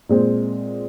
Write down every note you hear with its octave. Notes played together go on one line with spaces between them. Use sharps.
A#2 G#3 C4